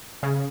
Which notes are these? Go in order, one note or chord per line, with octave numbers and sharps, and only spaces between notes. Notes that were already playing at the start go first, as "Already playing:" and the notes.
C#3